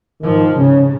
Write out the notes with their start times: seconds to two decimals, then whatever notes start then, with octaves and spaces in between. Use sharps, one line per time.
0.22 G#2 D#3 F3
0.58 C#3 C#4